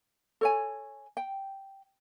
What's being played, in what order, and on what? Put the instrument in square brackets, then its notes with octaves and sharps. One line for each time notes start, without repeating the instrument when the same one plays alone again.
[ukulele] A4 C#5 G#5
G5